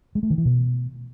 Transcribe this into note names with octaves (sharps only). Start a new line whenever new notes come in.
G#3
A3
D#3
E3
B2